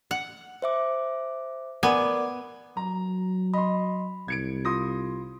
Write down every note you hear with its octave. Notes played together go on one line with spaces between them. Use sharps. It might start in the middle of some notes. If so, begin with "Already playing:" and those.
F#5
C5 E5 D6
B3 A#4 D5 G#5 D6
F#3 A#5
D#5 B5 C6
C2 G#6 C#7 D7
F4 C6 D#6 A#6